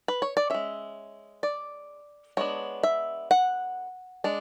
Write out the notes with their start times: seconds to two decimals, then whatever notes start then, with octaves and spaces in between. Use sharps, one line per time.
0.08 B4
0.22 C#5
0.37 D5
0.50 G#3 C#4 E5
1.43 D5
2.37 G#3 B3 D4 C#5
2.83 E5
3.31 F#5
4.24 G#3 D4